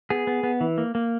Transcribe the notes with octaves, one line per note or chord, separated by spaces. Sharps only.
B3 G#4
B3
B3
E3
A#3
A#3